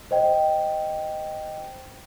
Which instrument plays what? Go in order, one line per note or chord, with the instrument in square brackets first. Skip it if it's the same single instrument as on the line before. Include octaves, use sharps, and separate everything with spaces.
[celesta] C5 D#5 G5